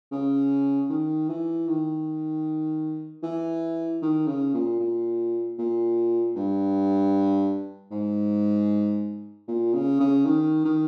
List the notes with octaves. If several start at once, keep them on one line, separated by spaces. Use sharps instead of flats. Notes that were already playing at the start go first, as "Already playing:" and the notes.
C#3
D#3
E3
D#3
E3
D#3
C#3
A#2
A#2
A#2
G2
G#2
A#2
C#3
C#3
D#3
D#3